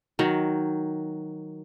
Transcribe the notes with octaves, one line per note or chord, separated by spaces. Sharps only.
D#3 F#3